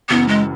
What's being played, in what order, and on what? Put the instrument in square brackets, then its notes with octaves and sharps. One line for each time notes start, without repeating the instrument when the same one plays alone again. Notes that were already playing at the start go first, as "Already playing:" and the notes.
[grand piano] F#1 F#2 E3 [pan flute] B3
[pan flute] G#3